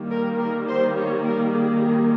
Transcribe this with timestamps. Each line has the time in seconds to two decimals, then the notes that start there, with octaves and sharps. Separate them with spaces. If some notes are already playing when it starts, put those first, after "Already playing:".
Already playing: D#3 G3 A#3
0.10 A#4
0.39 A#4
0.68 C5
0.96 C#5
1.25 A#4
1.53 G#4
1.82 G#4